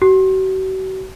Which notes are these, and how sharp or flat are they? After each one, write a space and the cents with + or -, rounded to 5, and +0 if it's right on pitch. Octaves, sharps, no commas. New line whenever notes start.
F#4 +40